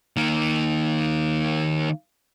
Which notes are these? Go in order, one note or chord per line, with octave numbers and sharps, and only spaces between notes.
D#3 A#3